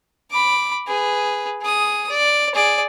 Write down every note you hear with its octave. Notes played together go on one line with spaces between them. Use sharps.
B5 D6
G#4 B4
G#4 D#6
D5
G#4 D5